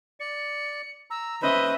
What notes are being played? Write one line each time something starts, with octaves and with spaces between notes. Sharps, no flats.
D5 C#7
A#5 E6
C#4 B4 C5 D#5 E5 B5